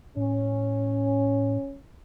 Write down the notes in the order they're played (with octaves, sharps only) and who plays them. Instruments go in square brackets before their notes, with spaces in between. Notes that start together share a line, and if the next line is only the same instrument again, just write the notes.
[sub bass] A2 [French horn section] C#4